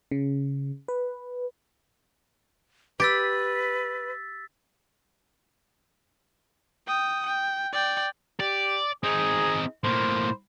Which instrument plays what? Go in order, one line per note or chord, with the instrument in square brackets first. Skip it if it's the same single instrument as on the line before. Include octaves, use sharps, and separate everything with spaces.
[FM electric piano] C#3
B4
[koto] G4 [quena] B4 [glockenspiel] E6 A6 B6
[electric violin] G5 D#6
G5
D5 G5
[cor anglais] G4 [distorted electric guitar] D5
[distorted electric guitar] C4 D#4 [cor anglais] G#4
[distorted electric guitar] A2 A#3 [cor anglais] C5